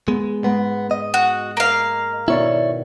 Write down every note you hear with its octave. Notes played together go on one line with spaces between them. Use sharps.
G#3 B3
G#2 G#3 B3
D#5
F#4
A#3 F5
B2 D#3 E4 C#5 D5